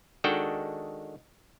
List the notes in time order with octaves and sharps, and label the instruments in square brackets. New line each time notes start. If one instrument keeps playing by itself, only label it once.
[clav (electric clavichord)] D#3 G#3 D4 F#4 A4 G5